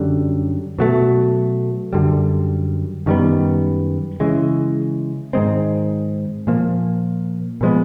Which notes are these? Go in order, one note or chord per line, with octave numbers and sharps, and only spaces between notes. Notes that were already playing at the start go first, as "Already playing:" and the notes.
Already playing: F#2 D3 G3
B2 F#3 A3
F#2 D3 G3
F#2 D#3 G3 B3
C#3 E3 G#3
G#2 D#3 G#3 C4
A#2 F3 A#3
A#2 F3 G#3 B3